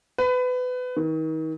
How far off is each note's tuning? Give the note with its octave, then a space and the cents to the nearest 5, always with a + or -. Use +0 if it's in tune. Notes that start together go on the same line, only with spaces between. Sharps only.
B4 +25
D#3 +35